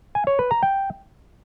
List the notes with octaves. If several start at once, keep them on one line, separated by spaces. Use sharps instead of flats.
G#5
C#5
B4
A#5
G5